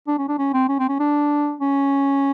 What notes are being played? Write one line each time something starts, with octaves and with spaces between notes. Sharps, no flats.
D4
C#4
D4
C#4
C4
C#4
C4
C#4
D4
C#4